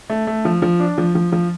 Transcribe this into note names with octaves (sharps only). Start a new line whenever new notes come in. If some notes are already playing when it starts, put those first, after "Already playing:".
A3
A3
F3
F3
D4
F3
F3
F3